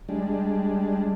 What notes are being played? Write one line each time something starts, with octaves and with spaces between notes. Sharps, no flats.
G3 G#3 D4